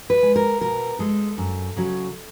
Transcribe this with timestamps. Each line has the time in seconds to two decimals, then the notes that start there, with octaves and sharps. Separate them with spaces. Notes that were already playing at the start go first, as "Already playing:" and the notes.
0.10 B4
0.23 G#3
0.36 A#4
0.61 B2 A#4
0.99 G#3 A4
1.38 F#2
1.76 C#3 F#3